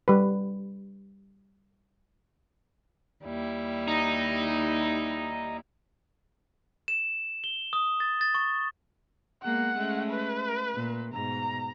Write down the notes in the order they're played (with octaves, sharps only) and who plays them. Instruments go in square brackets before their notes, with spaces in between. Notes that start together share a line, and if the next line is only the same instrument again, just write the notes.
[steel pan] G3 B4
[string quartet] D#2 G3 E4
[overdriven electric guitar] D#4
[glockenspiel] E7
G7
D#6
A6
A6
C#6
[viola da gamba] G#3 A#3 B3 [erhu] F#5
[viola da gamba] G#3 A3 C#4
[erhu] B4
[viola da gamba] A#2
[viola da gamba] G#2 B2 [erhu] A#5